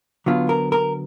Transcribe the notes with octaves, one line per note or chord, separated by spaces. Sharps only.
D3 F#3 B3 F4
A#4
A#4